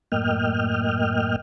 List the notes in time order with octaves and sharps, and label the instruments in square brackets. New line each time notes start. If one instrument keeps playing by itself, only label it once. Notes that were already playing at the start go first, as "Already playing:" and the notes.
[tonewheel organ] F#2 A2 A#3 D#5 G5 F6